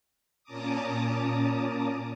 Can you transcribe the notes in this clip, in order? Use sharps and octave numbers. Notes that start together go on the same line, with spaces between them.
A#2 C#4 A5 A#5 D6 D#6